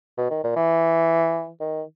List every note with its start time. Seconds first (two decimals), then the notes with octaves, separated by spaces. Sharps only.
0.17 B2
0.30 D#3
0.44 A#2
0.56 E3
1.61 D#3